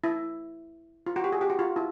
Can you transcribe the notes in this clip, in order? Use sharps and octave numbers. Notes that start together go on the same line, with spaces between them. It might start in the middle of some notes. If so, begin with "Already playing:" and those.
E4
F4
F#4
G4
G#4
G4
F#4
F4
E4